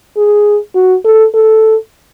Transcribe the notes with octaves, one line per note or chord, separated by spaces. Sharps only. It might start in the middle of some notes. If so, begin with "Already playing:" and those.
G#4
F#4
A4
A4